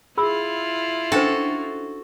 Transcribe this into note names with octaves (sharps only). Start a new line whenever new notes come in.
E4 F4 G#4 B5 E6
C#4 D4 F#4 A4 C5